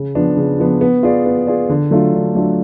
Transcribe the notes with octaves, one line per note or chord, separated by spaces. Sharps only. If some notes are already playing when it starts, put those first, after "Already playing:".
Already playing: C#3
F3 B3 D4
C#3
F3 B3 D4
B3
F4 G#4 D5
B3
F4 G#4 D5
D3
F#3 A3 D4 F4
D3
F#3 A3 D4 F4